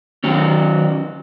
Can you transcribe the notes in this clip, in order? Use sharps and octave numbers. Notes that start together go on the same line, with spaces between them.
D#3 F#3 C#4